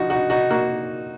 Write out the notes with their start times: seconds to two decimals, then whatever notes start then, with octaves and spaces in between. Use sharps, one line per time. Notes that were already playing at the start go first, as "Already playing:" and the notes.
Already playing: F3 D#4 F#4
0.10 D#4 F#4
0.30 D#4 F#4
0.50 A#3 F#4